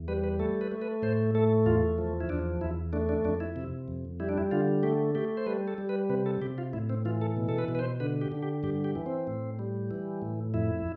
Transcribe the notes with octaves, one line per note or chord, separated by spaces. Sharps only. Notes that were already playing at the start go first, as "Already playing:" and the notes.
Already playing: E2
G3 B4
B4
A3 A4
B4
A3
B4
A2 C5
A3 A4
E2 F4
F3
E4
E2 D4
E2 E4
A3 D4
D4
F2 D4
E4
C3
F2
G3 E4
D4
E4
D3 F4
A3 G4
A3 G4
C5
G3 B4
A4
G3
B4
C3 B4
A4
C3 G4
F4
A2 E4
C4
E3 F4
A4
B2
A4
B4
B2
B4
C5
D3 B4
G4
D3
G4
G2 G4
G4
E3
C4
A2
G3
E3
A2
F2 E4